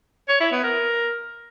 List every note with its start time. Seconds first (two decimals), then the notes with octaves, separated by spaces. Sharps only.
0.29 C#5
0.40 E4
0.52 B3
0.64 A#4